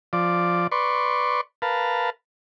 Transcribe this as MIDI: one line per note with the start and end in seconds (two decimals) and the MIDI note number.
0.13 0.67 53
0.13 0.67 74
0.71 1.41 71
0.71 1.41 74
0.71 1.41 84
0.71 1.41 85
1.62 2.10 70
1.62 2.10 71
1.62 2.10 77
1.62 2.10 81